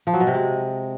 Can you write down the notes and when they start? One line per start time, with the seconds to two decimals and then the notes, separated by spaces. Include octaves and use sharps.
0.07 F3
0.14 F#3
0.20 B2
0.27 C3
0.34 G#3